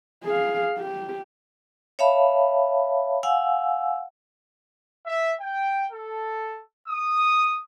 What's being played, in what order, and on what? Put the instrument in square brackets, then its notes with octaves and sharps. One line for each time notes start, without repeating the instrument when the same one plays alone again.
[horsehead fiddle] G#4 F5
G4
[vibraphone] C#5 E5 F5 A5 B5
F5 F#5 G#5 E6
[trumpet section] E5
G5
A4
D#6